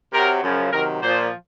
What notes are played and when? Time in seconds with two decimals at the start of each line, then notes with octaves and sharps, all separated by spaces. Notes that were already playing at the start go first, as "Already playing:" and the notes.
0.13 C3 F#3 A#4
0.42 F#2 C#3 F3
0.72 C3 D#3 F#3 A#4
1.02 A#2 F3 C5